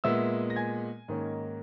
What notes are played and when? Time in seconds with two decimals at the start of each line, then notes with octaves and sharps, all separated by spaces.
0.04 A#2 G#3 B3 E5 E6
0.50 A#6
0.56 G#5 G#6
1.08 G#2 D#3 A#3 C#4